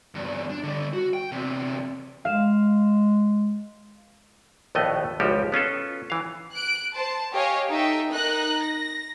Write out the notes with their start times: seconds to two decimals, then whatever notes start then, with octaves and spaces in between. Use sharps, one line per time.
0.15 E2 G2
0.50 D4
0.63 D3 G3
0.93 F#4
1.14 G5
1.32 E2 C3
2.25 G#3 F5 E7
4.75 A#1 D#2 A2 A3 B3 D#5
5.20 G#1 C#2 F3 G3 F#4 G4
5.52 B3 C#4 F4 A4
6.10 E3 F5
6.53 F#6 D7
6.94 C5 A5
7.33 G4 C#5 D#5 F5 G#5
7.70 D#4 A4 E5 G5
8.11 D#4 A#4 A#5 F#6
8.62 A#6